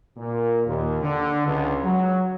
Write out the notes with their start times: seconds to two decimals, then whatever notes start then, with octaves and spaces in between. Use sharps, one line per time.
0.17 A#2
0.66 D#2
1.01 D3
1.45 C#2
1.83 F#3